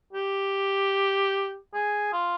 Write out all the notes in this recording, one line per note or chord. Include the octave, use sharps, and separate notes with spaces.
G4
G#4
F4